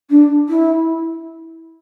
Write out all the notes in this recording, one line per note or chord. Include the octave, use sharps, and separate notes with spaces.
D4
E4